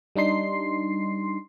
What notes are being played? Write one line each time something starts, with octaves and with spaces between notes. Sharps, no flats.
G3 D4 D#4 C6 C7